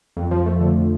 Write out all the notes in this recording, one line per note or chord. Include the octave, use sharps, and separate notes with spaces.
F2
F3
A3
D3